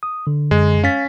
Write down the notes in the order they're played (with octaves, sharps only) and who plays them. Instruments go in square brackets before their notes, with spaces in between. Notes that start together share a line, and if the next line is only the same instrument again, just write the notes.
[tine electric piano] D#6
D3
[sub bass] F#2 [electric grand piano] G#3
[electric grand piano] C#4 B6 [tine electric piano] F5 A6